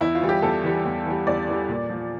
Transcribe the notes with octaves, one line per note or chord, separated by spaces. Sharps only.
E2 E4
F4
E3 G3
G4
E2 A4
E3 G3
E2
E3 G3
E2 D5
E3 G3
A#2
F3